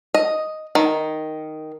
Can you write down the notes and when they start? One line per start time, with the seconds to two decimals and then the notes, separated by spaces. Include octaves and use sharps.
0.14 D#5
0.75 D#3